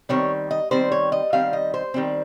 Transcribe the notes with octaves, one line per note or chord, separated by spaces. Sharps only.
D#3 G3 C4 C#5
D#5
D#3 G3 C4 C5
C#5
D#5
D#3 G3 C4 F5
D#5
C5
D#3 G3 C4